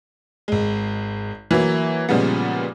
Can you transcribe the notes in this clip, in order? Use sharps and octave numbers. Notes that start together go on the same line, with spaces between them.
G#1 G#3
E3 F#3 A#3
A#2 C#3 F3 G3 G#3 B3